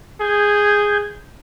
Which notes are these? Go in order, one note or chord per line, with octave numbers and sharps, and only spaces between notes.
G#4 G6 G#6